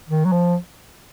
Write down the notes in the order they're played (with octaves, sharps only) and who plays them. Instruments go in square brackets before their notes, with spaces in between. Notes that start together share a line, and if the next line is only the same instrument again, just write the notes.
[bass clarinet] D#3
F#3
F3